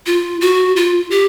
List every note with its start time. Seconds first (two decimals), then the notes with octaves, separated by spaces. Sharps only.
0.06 F4
0.41 F#4
0.76 F4
1.11 G4